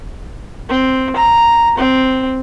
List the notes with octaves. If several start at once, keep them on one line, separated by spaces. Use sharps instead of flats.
C4
A#5
C4